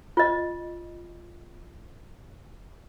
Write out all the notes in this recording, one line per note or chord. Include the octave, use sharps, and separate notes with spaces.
F4 D#5